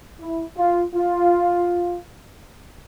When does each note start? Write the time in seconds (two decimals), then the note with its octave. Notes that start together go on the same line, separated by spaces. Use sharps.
0.19 E4
0.57 F4
0.95 F4